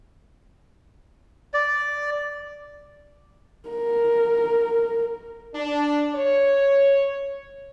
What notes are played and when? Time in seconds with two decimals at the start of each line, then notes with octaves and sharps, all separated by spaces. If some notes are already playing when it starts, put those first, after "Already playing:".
1.54 D5
3.69 A#4
5.54 D4
6.15 C#5